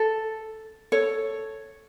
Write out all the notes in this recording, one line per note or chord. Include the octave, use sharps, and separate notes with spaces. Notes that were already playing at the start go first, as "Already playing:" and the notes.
Already playing: A4
A4 C#5